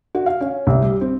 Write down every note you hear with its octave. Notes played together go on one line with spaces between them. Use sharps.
F#4
F5
C#4
C2
G3
C4